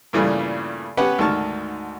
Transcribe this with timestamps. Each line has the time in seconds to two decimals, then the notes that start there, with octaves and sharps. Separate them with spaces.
0.13 G2 A#2 C#3 E3 G3 A3
0.97 B3 C#4 G4 B4 F#5
1.19 D2 G#2 D#3 A5 C#6 F6